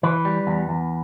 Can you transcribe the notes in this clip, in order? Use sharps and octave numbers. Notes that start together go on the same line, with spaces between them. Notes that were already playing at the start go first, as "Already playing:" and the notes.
E3 B4
G3
E2
E2